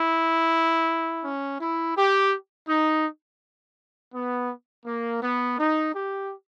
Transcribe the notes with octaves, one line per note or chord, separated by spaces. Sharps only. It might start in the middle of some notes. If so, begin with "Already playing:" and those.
Already playing: E4
C#4
E4
G4
D#4
B3
A#3
B3
D#4
G4